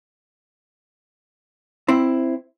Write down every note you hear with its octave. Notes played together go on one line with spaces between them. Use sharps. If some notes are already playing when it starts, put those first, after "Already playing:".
C4 E4